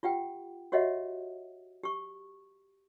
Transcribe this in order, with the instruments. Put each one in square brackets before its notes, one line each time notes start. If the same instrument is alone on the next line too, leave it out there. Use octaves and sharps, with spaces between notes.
[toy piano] F4 G4 F#5 G5
F#4 G4 C#5 D#5 E5 F#5
G4 C#6